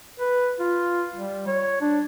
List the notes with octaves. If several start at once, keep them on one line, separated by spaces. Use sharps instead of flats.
B4
F4
G3
C#5
D4